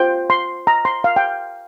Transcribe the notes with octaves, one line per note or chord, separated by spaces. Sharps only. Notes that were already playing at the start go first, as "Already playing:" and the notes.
Already playing: F4 C5 G5
C6
A#5
C6
F5
G5